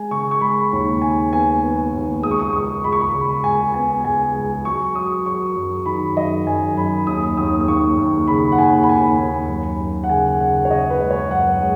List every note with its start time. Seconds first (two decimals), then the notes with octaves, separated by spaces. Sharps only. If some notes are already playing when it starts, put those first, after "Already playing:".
Already playing: G#3 G#5
0.11 C#3 C#6
0.31 C#6
0.41 G#3 B5
0.72 D#2
1.02 G#3 G#5
1.32 B3 G#5
1.62 B3
1.93 D#2
2.23 C#2 D#6
2.31 C#6
2.40 D#6
2.53 C#2 C#6
2.84 C#2 B5
2.92 C#6
3.01 B5
3.14 C#3
3.44 C#2 G#5
3.74 B3 G#5
4.05 C#2 G#5
4.35 C#2
4.65 F#3 C#6
4.95 F#3 D#6
5.26 F#3 C#6
5.56 F#2
5.86 D#3 B5
6.16 F#2 D#5
6.47 F#2 G#5
6.76 F#2 B5
7.07 D#2 D#6
7.37 D#2 D#6
7.60 D#6
7.68 D#2 C#6
7.98 D#2
8.28 C#3 B5
8.52 F#5
8.58 D#2 G#5
8.83 B5
8.89 D#2 G#5
9.18 D#2
9.49 F#2
9.80 F#2
10.04 F#5
10.09 C#3 G#5
10.40 C#3 F#5
10.65 C#5
10.70 C#3 D#5
10.90 B4
11.01 G#3
11.11 C#5
11.31 F#2 F#5
11.61 G#3